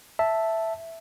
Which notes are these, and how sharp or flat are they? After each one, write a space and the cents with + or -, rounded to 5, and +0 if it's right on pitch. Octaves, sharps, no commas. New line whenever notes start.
E5 +0 A5 +0